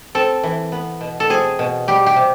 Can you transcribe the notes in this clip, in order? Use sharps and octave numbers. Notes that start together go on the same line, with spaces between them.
C4 A4
E3
B3
B2
A4
C4 G#4
B2
G3 G4
G4
C3